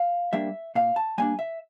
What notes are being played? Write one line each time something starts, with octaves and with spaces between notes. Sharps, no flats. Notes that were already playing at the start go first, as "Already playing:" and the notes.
Already playing: F5
G3 A#3 D4 E5
A#2 F5
A5
G3 A#3 D4 G#5
E5